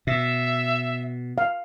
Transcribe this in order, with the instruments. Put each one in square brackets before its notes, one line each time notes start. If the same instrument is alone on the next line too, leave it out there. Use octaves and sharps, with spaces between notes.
[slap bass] B2 [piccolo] E5
[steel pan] F5